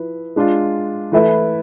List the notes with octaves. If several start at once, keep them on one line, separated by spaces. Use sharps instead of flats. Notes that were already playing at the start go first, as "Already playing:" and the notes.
Already playing: F3 E4 B4
G#3 D4 F4
E3 A3 E4 B4 E5